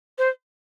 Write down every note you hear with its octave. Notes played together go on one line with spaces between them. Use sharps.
C5